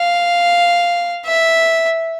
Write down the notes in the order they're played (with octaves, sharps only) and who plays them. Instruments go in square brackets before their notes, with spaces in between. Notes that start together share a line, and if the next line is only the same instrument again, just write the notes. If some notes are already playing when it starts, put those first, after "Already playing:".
Already playing: [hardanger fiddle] F5
E5